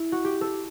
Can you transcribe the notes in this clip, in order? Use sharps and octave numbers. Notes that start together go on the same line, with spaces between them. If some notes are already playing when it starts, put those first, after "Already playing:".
Already playing: E4
F#4
G4
A4